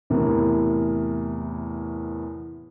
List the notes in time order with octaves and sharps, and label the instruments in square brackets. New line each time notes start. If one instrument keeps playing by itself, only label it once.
[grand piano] E2 A2 C3 A#4